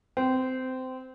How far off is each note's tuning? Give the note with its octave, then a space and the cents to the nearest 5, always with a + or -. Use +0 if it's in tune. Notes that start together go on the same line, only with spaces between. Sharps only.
C4 -20